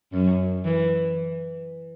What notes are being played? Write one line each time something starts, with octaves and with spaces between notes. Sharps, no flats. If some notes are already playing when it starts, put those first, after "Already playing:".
F#2
E3